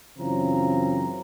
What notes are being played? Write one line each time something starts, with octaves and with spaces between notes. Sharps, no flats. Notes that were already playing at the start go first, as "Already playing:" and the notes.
F#2 C#3 E3 C4 F4 A#5